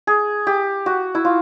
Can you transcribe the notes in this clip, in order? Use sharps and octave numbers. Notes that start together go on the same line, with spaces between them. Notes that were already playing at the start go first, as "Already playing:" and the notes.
G#4
G4
F#4
E4
F4